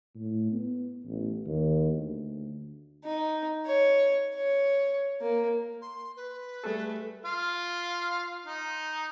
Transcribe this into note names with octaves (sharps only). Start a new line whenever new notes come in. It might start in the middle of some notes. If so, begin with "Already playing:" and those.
A2
B3
A1
D#2
D2
D#4
C#5
C#5
A#3
C6
B4
G3 A3 G#4 A4
F4 F5
D#4